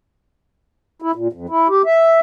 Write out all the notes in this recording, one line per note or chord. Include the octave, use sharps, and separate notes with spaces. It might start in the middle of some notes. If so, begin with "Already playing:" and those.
E4
A#2
F2
E4
G4
E5